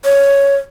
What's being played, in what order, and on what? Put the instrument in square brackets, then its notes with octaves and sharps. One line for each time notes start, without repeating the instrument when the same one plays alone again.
[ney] C#5